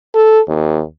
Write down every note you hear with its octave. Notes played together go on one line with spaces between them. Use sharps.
A4
D#2